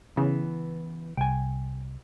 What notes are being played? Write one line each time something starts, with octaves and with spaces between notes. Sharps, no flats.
C#3 E3 B3
C2 G5 G#5